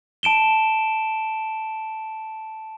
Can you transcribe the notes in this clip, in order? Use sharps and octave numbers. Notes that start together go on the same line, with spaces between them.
A5 D7 E7 G7